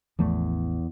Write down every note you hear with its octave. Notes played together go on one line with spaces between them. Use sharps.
A1 E2 F3 A3